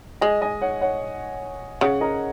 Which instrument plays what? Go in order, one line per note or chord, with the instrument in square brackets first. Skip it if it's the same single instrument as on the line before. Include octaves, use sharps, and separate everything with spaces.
[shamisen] G#3 [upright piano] D#5 G#5
[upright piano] D#5 G#5
C#5 F#5
C#5 F#5
[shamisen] C#3 [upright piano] C#5 F#5
[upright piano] A#4 D#5